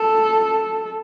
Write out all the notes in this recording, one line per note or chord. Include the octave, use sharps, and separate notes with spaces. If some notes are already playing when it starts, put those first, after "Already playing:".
Already playing: A4